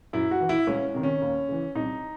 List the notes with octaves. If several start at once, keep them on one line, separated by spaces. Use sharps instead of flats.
F#2 E4
F#4
E3
E4
C#2 C#4
C3 D#3
C#4
D#2
C#3 E3
C2 D#4